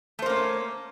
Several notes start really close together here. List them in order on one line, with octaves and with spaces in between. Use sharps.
A3 C5 A#3 C#4